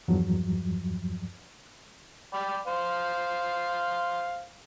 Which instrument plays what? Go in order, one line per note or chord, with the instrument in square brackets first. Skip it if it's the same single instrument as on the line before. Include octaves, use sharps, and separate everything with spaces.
[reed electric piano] E2 G2 F3 F#3
[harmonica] D5 G5 B5
C5 F5